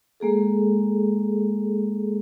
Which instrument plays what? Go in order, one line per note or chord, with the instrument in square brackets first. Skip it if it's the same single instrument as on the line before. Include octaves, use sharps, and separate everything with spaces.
[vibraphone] G#3 A#3 G#4 A4